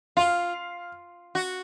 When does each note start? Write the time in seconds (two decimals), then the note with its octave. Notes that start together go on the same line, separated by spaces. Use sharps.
0.17 F4 F5
1.35 F#4